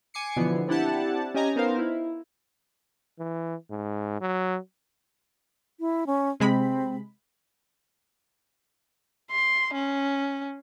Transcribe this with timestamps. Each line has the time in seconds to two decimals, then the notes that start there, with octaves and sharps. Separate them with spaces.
0.14 G#5 D6 C7 C#7
0.36 B2 D3 E3 F3 B3
0.68 C4 D4 E4 G4 F#5 A5
1.34 C#4 G4 D#5 G#5 A#5
1.56 B3 D#4 A#4 C5 F5
1.78 E4
3.19 E3
3.71 G#2
4.21 F#3
5.80 E4
6.07 C#4
6.40 C3 G#3 C4 B5
9.31 C6
9.74 C#4